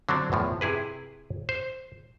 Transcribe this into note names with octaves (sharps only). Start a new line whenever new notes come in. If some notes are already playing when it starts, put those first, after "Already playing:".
D3 F#3 C4 D4
E2 A2 F3
C3 E4 G#4 B4
C5